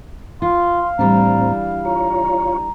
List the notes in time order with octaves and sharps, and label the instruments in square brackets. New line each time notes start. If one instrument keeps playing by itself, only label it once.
[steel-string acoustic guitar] F4 [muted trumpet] F5 [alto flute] C6
[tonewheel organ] A2 C4 [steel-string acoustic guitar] E3 G3 D4 [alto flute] A#5
[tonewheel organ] F4 C#5 [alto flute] A#5